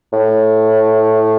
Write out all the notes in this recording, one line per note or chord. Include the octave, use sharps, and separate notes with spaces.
A2